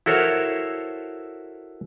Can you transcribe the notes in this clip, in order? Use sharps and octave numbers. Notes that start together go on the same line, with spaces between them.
E4 F#4 A4 A#4 C5 C#5